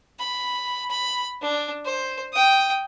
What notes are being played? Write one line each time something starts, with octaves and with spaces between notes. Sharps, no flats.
B5
B5
D4
C5
G5 D#6